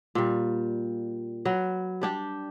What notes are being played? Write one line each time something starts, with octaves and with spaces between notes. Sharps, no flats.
A#2 G3
F#3 B4
G3 D4 G4